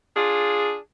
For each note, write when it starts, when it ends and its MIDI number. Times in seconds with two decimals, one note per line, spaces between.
0.16 0.76 62
0.16 0.76 65
0.16 0.76 68